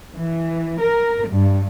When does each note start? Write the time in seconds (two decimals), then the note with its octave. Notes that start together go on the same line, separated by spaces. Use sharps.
0.11 E3
0.78 A#4
1.26 G2